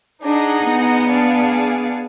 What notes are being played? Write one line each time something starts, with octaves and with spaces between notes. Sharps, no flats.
D4 D#4 G#4 D#5 F#5
B3
D4 G#4 D5 F5